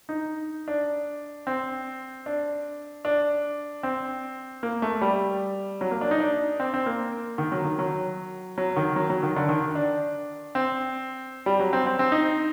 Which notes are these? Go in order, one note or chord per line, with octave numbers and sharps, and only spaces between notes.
D#4
D4
C4
D4
D4
C4
A#3
A3
G3
F#3
A#3
D4
D#4
D4
C4
C4
A#3
D#3
F#3
D#3
F#3
F#3
D#3
F#3
F#3
D#3
D3
D#3
D4
C4
G3
F#3
C4
C4
C4
D#4